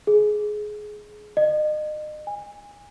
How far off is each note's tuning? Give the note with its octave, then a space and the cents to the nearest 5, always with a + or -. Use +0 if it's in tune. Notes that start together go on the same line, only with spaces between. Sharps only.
G#4 +20
D#5 -35
G#5 -25